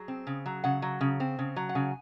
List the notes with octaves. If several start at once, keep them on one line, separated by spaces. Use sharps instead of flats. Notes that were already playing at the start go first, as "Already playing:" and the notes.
Already playing: F#3 G#4
C4
C#3
F#3
C#3 F#5
F#3
C#3
C4
C#3
F#3
F#5
C#3 G#5